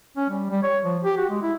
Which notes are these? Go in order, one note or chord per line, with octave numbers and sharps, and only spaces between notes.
C#4
G3
G3
C#5
F3
G4
F#4
G#3
E4